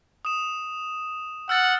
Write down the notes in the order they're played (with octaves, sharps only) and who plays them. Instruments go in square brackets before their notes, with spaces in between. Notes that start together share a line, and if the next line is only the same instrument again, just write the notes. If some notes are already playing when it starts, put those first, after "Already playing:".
[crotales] D#6 E7
[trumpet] F#5 [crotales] E6 F6 A6